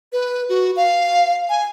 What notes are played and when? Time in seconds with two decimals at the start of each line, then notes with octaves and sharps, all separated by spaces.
0.13 B4
0.49 F#4
0.76 F5
1.49 G#5